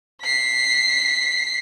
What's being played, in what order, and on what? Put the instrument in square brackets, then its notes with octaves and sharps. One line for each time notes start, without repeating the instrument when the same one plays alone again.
[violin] B6 C7